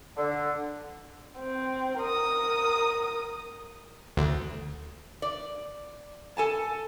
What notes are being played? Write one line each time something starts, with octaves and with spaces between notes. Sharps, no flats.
D3
C4
A#4 D#6
D2
D5
A4 G#5 A5